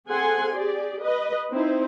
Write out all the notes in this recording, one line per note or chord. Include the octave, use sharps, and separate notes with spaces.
C4 G#4 A4 F#5 G#5 C6
G4 G#4 D5
B4 D#5
C4 D#4 E4 C5